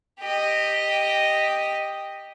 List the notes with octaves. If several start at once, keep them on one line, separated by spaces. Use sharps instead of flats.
G4 D#5